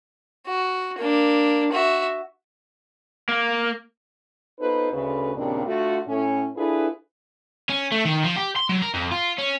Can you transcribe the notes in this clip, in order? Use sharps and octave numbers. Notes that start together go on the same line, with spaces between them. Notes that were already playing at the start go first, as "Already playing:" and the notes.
F#4
A#3 D4
F#4 E5
A#3
B3 D#4 F4 A4 B4 C5
D2 C#3 B4
D#2 A#2 C#3 G3 C4 D4
D3 A3 F4 F#4
A2 C#4
D4 E4 F4 G#4 A4 B4
C#4
A3
D#3
F3
G4
C6
F#3
A#4
F2
F4
C#4